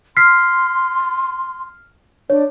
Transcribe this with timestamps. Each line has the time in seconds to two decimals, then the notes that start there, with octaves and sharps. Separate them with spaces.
0.17 C6 F6 B6 C7
2.30 D4 C#5